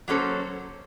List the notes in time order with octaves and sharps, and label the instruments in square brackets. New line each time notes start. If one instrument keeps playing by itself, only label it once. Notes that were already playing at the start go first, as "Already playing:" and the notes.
[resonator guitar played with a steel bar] F#3 A#3 C#4 A4 C5